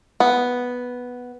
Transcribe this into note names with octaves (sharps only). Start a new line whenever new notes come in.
B3